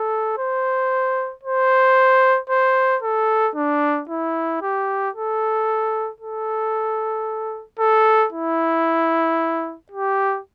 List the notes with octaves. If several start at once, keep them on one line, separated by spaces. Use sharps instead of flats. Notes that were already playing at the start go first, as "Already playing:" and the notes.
Already playing: A4
C5
C5
C5
A4
D4
E4
G4
A4
A4
A4
E4
G4